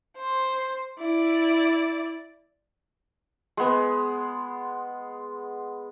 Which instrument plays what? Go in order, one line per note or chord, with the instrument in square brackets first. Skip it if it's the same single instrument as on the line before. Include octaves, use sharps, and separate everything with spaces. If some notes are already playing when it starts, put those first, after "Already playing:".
[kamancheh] C5
E4 D5
[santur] G#3 B3